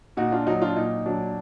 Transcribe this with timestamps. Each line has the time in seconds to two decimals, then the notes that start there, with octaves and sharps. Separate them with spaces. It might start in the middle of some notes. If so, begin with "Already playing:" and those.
0.17 A#2 D#4 F#4
0.32 D4 F4
0.46 F#3 D#4 F#4
0.62 D4 F4
0.76 A#2 D#4
1.06 F#3 D4